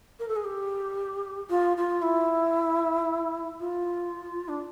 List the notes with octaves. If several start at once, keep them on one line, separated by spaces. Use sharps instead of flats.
A#4
A4
G#4
G4
F4
F4
E4
F4
D4